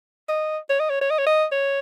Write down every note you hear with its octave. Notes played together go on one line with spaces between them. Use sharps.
D#5
C#5
D#5
C#5
C#5
D#5
C#5
D#5
C#5